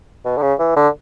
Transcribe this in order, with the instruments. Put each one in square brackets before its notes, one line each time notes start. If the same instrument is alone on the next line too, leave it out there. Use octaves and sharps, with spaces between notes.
[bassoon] B2
D3
C#3
E3
D3